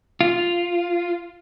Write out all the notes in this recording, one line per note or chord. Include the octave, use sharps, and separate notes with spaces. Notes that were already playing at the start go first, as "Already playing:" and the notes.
F4